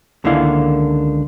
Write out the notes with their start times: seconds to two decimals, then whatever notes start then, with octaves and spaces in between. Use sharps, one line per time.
0.24 C#2 D3 D#3 A#3 E4 F5